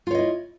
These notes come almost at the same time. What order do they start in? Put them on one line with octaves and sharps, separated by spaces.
F4 C#5 D#5 E4